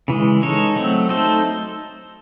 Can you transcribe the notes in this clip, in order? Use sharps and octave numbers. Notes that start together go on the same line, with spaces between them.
C#3 E3 G#3
G#3 D#4 A4 C#5
F#3 A3 C4
A3 D#4 A4 C5